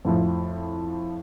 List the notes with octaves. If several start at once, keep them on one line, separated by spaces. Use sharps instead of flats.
F2 A2 F3